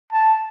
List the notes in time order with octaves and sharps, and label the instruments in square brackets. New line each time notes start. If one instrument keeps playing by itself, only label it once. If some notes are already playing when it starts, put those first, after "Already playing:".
[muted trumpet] A5